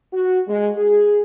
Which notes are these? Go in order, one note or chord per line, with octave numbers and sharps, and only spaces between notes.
F#4
G#3
G#4